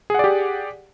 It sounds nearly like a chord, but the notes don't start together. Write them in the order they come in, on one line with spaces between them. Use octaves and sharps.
G#4 F#5 D5 G4